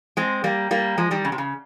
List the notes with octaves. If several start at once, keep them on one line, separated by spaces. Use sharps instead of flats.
G#3 C4
G3 A#3
G3 A#3
F3 G#3
D#3 G3
C#3
C3
C#3